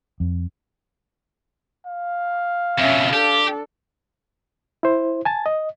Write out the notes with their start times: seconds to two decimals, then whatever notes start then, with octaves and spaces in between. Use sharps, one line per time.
0.20 F2
1.87 F5
2.78 F2 B2 C#4 E5
3.13 D4 G4 A4
4.83 E4 C5
5.25 G#5 A5 A6
5.46 D#5